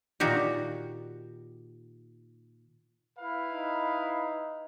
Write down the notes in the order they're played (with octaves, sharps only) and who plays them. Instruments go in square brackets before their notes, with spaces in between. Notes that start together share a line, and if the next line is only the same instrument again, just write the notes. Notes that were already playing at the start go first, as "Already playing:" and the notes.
[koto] A#2 D#3 F#4 G4
[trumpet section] E4 B4 F5
[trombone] D#4